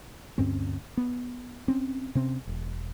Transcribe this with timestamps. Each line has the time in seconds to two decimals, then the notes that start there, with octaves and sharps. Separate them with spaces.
0.38 D2 G2 C4 C#4
0.97 B3
1.68 C4 C#4
2.15 C3 C4 C#4
2.47 E1